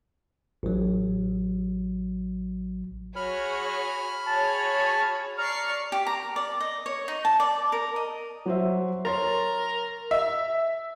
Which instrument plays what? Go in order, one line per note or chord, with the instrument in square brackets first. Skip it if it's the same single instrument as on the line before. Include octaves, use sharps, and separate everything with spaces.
[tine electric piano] A1 F#3
[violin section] F#4 G#4 C#5 [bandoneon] B5 F6
[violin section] F#4 G#4 C#5 [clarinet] A5
[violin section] D5 C#6 C7 [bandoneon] A#5 [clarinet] F6
[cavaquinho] G4
A#5
D5
D#5
C#5
D#4
A5
D5
A#4
D#5
[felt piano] F#3 C5 E5
[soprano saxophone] A#4 [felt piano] C#5 C6 A6
[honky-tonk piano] E5